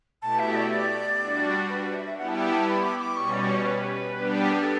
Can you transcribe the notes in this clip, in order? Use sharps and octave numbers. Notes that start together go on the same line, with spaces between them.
B2 A3 E4 G4 A5
E5
D5
D5
G3 D4 F#4
B4
B4
E5
E5
G3 B3 E4 G4 F#5
A5
G5
A5
B5
D6
D6
B2 G3 C#4 C#6
D5
C#5
B4
G3 B3 D4 G4
G4
A4